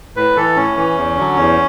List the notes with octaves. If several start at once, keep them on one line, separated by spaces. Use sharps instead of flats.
A2 B4
E3 A4
A2 C#4
E3
E2
D3 F#3
E2